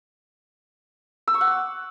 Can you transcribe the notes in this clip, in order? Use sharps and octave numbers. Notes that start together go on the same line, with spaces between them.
E6
C#6
F#5
D6